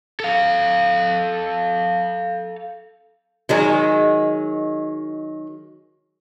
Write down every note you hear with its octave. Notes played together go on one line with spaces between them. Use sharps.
A4 F5
D#3 F#3 G#3